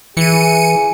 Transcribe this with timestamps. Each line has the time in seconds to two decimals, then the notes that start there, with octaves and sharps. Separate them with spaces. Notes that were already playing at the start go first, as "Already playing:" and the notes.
0.17 E3 G#4 C#7 D#7